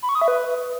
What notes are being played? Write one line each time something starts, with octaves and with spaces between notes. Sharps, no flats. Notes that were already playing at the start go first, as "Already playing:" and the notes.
B5
C#6
D#6
E5
B4